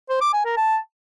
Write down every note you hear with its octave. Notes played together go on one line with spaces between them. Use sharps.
C5
D6
G#5
A#4
A5